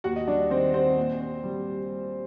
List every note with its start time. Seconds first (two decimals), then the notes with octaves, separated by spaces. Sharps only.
0.04 D#2 F#4 F#5
0.16 D#5
0.27 G3 D4 D5
0.50 D#3 C4 C5
0.74 C4 C5
0.97 A#2
1.20 C4
1.43 G3